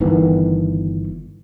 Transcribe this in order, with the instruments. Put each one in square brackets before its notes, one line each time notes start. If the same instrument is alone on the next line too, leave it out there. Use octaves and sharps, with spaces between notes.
[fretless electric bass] G1 D#3 E3 B3